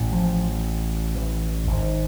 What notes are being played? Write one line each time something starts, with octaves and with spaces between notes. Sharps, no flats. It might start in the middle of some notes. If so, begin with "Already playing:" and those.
Already playing: A1 A2
F3
E3
G#1 G#2